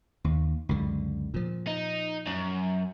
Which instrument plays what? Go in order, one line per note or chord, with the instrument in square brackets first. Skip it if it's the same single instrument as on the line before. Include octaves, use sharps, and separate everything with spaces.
[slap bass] D#2
C#2 F#2 D3
A#2 F3
[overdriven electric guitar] D#4
F#2